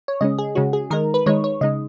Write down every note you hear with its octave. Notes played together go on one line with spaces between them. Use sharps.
C#5
C#3 G#3 C#4 D#5
G#4
C#3 G#3 C#4 F#4
G#4
D#3 G#3 D#4 A#4
B4
D#3 G#3 D#4 C#5
C#5
C#3 G#3 D#4 D#5